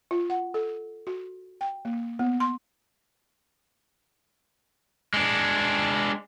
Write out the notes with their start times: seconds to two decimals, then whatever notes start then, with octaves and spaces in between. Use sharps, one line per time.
0.11 F4
0.30 F#5
0.54 A4
1.07 F#4
1.61 G5
1.85 A#3
2.19 B3
2.40 C6
5.14 G#3 D4